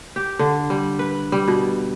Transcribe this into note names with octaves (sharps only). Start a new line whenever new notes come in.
G4
D3
G3
B4
G3
B2